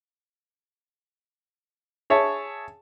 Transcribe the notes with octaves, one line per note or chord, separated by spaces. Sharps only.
G#4 C#5 E5 A5